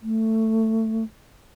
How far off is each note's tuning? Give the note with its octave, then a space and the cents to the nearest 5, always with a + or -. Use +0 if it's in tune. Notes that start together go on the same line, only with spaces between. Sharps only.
A3 +15